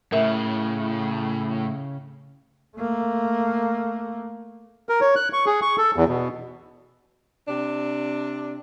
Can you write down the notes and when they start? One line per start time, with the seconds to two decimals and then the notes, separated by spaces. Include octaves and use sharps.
0.12 A2 C#3 A#4 E5
2.76 A3 A#3
4.89 A#4
5.01 C#5
5.16 F#6
5.33 C#6
5.46 G#4
5.62 C#6
5.78 A4
5.96 E2
6.08 B2
7.48 C3 D4